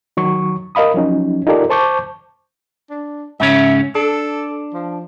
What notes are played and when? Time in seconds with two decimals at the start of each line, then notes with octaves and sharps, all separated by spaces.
0.17 D#3 F#3 C#6
0.75 A#4 D#5 F5 B5 D#6
0.94 F3 F#3 C#4 D#4
1.47 D#4 F4 G4 A4 A#4 D5
1.70 C5 A5 C#6 D6 G6
2.90 D4
3.40 G#2 C#3 C#4 E5
3.95 D4 A4
4.74 F3